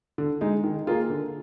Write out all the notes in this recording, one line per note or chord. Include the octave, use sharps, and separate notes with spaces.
D3
G#3 D#4
D#3
A#3 F4 G#4
D3